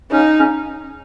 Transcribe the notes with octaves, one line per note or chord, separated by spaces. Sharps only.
C#3 C#4 D#4
C#3 C#4